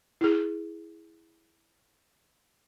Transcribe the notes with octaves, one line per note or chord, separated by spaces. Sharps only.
E4 G#4